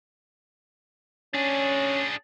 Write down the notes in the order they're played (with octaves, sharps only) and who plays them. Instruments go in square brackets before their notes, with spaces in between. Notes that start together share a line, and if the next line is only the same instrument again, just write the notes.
[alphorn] C#4 [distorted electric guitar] D4 G#4